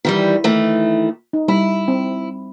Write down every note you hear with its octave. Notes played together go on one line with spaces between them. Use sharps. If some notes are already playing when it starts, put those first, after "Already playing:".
D#3 E3 G3
D#3 E3 A3
D#4
G3 E4 B5
C4